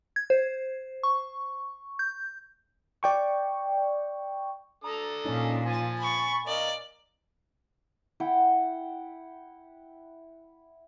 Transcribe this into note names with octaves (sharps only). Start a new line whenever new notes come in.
G#6
C5
C#6
G6
D5 G5 C#6
D4 A4 A#5 D#6
A#2 C#4 D#4
F3 G#5 A6
B5 C#6
A#4 D5 D#5 F5
E4 F#5 G5